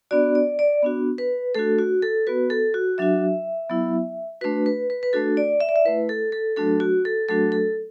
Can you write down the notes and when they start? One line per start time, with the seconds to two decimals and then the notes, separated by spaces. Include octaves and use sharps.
0.11 B3 D4 F#4 D5
0.35 D5
0.59 D5
0.83 B3 D4 F#4
1.18 B4
1.55 A3 D4 F#4 A4
1.79 F#4
2.02 A4
2.27 B3 F#4 B4
2.50 A4
2.74 F#4
2.98 F#3 D4 F#4 E5
3.70 F#3 B3 E4
4.41 A3 D4 F#4 B4
4.66 B4
4.90 B4
5.03 B4
5.13 A3 D4 F#4 A4
5.37 D5
5.61 E5
5.69 D5
5.76 E5
5.85 A3 E4 B4
6.09 A4
6.32 A4
6.56 F#3 A3 D4 F#4 A4
6.80 F#4
7.05 A4
7.28 F#3 A3 D4 F#4 A4
7.52 A4